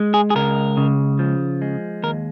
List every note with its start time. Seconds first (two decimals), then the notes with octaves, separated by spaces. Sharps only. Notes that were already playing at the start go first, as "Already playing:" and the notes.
Already playing: G#3
0.14 G#4
0.30 G#4
0.35 C#2 A#4
0.77 C#3
1.19 F3
1.62 G#3
2.03 D#2 A#4